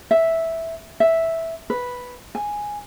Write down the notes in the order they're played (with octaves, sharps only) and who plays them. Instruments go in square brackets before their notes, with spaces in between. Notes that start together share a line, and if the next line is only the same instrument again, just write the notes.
[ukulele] E5
E5
B4
G#5